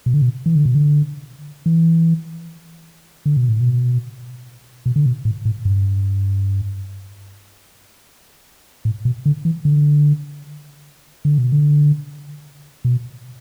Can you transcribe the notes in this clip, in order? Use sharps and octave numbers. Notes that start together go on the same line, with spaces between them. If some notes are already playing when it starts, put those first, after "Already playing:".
B2
D3
B2
E3
D3
B2
D3
E3
D3
B2
A2
B2
B2
D3
B2
A2
A2
G2
A2
B2
D3
E3
D3
D3
B2
D3
B2